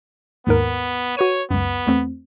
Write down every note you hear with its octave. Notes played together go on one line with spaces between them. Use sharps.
D#2 G#2 B3 A#4
F#4 B4 C#5 D#7
C#2 F#2 B3
E2 A3 C4